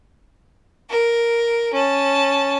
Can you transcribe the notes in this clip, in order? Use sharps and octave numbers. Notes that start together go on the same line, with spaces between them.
A#4
C#4 A5